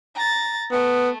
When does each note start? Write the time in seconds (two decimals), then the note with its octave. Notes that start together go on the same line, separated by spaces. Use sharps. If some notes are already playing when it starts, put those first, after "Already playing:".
0.15 A#5 A6
0.72 A3 B3